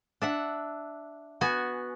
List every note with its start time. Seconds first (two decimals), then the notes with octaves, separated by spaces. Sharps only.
0.22 D4 E5 F#5
1.41 B3 F#4 G#5